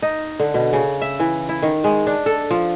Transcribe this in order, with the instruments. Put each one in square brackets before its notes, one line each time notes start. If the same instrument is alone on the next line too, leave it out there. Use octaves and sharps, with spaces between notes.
[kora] D#4
D3
B2
C#3
E5
E3
E4
D#3
G#3
D4
A4
F3